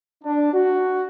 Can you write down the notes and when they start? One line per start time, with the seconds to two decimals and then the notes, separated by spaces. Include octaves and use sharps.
0.24 D4
0.54 F#4